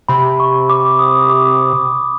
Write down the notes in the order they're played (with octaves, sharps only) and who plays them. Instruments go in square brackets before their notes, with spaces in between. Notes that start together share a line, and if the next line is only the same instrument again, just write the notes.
[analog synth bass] C3 [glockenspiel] B5
[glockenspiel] C#6
D6
D#6
D6